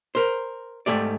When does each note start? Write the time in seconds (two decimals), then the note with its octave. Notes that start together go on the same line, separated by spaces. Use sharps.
0.15 A#4 C5
0.86 G#2 A3 G4 D5